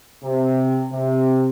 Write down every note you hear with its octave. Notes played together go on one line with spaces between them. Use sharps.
C3
C3